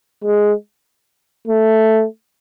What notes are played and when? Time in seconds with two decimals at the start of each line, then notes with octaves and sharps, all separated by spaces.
0.24 G#3
1.48 A3